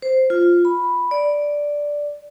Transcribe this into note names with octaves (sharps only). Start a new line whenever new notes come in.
C5
F4
B5
D5